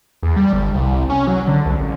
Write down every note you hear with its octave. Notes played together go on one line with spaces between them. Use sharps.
E2
G3
G1
C2
C#4
F#3
D3
C2
A1